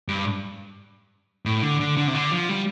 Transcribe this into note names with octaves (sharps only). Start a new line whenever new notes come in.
G2
A2
D3
D3
D3
C3
D3
F3
G3